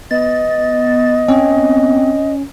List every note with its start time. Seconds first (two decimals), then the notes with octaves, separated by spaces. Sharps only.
0.11 B3 D#5 A6
1.28 C4 C#4